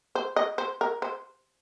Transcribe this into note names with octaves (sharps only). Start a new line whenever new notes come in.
C5
D#5
C5
A#4
C5